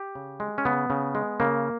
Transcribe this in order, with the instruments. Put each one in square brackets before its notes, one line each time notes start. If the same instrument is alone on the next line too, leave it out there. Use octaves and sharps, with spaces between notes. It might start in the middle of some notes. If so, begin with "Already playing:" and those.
Already playing: [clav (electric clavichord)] G4
C#3
G#3
C#4
C#3 B3
C#3
G#3
C#3 A#3